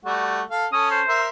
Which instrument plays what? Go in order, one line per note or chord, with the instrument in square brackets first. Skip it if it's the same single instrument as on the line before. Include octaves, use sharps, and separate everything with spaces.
[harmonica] G3 A3 F#4
A4 F5
[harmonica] C#4 A4 [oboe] D#6
[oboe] C5
[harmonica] A#4 E5 C6